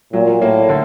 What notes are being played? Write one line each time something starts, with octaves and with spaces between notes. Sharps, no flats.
A#2 F#3
A2 A#3
D3